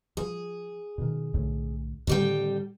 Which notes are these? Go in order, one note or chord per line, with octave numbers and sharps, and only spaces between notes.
F3 G#4
B2 D#3
B1 A2 D3
F2 A2 D3 D#3 G3 G5